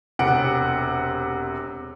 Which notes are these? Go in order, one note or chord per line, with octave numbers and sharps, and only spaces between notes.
E1 C3 F#5 D7